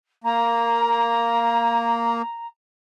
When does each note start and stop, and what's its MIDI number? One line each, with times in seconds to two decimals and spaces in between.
0.24 2.22 58
0.24 2.47 82